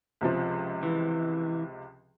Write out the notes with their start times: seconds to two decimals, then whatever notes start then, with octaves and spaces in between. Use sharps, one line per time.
0.21 C#2 C3 F3
0.83 E3